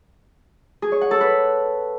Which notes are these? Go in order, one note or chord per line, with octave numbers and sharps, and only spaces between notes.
G#4
C#5
F#5
A4
B4